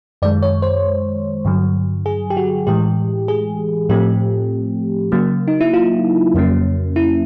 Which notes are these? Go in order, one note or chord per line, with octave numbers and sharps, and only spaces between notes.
F#2 D#3 G#3 D5
C#5
C5
G2 D3 F#3
G#4
G4
F#4
A2 E3 G#3 G4
G#4
A2 F3 A3 C4 G4
C#3 F#3 A#3
D#4
E4
F4
F2 C#3 F#3 A#3 C#4
E4